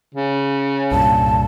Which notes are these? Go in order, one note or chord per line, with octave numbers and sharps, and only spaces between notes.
C#3
C2 G2 A#2 A5